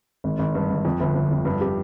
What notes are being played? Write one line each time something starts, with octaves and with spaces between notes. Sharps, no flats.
G#1
G#1
G2
G#1
F2
G1
G1
F2
G2
G4